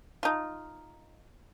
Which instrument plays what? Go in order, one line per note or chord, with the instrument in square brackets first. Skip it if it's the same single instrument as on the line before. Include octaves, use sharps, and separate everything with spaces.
[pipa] D#4 F4